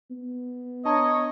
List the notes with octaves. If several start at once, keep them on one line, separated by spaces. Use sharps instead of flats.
B3
D4 C#5 D#5 A5 A#5